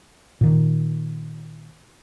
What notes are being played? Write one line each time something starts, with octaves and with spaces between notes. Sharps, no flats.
A#2 D#3